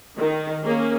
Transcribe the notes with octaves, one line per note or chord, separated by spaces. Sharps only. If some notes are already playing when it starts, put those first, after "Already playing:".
D#3
A#3 C#4 G#4